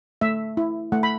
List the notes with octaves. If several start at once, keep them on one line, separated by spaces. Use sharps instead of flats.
A3 E5
E4
A3 F#5
B5